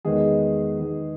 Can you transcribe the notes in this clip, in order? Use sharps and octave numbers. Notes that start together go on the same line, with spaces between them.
E2 D#3 G#3 B3 D#4 G#4
E2 D#3 G#3 B3 D#4